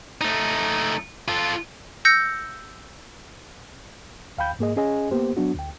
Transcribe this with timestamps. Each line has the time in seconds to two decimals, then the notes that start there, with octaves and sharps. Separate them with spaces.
0.21 A3 D#4
1.28 F4 A4
2.05 E6 G6 A#6 C#7
4.38 D2 F5 G5 B5 G6
4.59 G#2 A#3 G#4 D#5
4.76 C#4 G#4 D#5 G#5
5.11 A#3 B3 G4 C5
5.37 F#3 B3 D4 F#4
5.54 D2 G5